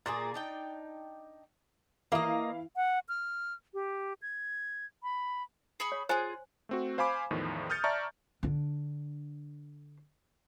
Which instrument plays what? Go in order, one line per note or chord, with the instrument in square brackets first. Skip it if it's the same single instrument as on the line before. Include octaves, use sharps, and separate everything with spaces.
[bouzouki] A#2 A#3 G#4 [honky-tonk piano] A6
[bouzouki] D4 D#4 G5
[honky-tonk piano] E3 E4 F5 [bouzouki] A#3 D#5
[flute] F#5
F6
G4
G#6
B5
[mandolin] G#4 B5 C#6
[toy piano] C#5
[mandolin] F4 G#4 [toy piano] C5 G#5
[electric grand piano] A3 C4 F#4
C5 F5 G#5 B5 D6
E2 A2 D#3 F3
D#6 F6 G6 A6 C#7
D5 E5 A5 A#5 C#6 F6
[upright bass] D3 D4